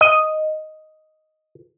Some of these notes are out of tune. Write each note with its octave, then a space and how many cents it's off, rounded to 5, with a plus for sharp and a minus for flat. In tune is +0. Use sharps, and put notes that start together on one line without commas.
D#5 +0